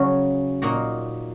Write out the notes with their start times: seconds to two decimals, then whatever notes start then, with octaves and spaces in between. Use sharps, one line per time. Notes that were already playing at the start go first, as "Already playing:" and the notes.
Already playing: C#3 F#3 C#4 F#4
0.62 A#2 A#3 D#4 F#4